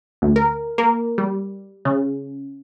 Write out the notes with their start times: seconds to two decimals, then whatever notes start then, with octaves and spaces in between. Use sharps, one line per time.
0.22 D2
0.36 A#4
0.78 A#3
1.18 G3
1.85 C#3